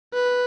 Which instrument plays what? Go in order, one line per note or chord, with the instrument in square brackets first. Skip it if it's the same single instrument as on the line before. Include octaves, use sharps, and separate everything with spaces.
[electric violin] B4